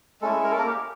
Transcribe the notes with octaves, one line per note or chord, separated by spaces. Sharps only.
G#3 A3 C#4 E4 A4
A#4
A4
A#3 A#4
G4